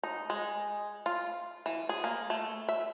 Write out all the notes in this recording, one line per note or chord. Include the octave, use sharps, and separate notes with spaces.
D#4
G#3
F4
E3
G#4
A#3
A3
E5